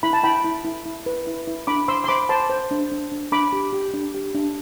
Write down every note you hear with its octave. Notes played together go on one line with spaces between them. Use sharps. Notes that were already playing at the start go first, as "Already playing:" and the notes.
E4 B5
A5
E4 G5 B5
E4
E4
E4
B4
E4
E4
D4 B5 D6
C5 C6 E6
C6
C5 B5 D6
C5 A5 C6
C5
D4
D4
D4
D4 B5 D6
G4
G4
D4
G4
D4